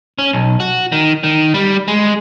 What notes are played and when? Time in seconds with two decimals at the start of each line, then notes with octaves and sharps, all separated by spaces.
0.18 C#4
0.33 B1
0.60 F#4
0.92 D#3
1.24 D#3
1.54 G3
1.88 G#3